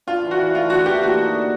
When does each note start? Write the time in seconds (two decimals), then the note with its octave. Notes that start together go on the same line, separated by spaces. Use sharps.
0.07 D4 F4
0.23 E3
0.31 F#4
0.39 E3
0.55 A3 F4
0.70 D4 F#4
0.86 E3 G4
1.02 A#3 F#4
1.18 D#4
1.34 D3